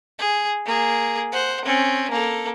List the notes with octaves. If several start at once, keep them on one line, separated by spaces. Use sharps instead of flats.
G#4
A#3 G#4
C5 F#5
C4 C#4
A#3 A4